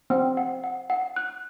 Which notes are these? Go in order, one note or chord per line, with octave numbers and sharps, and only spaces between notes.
C4 F#5
F#5
F#5
F#5
F#6